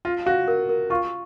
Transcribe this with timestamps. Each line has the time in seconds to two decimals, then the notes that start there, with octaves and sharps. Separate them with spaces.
0.05 F4 F5
0.26 F#4 F5
0.48 A#4
0.69 A#4
0.90 F4 C#6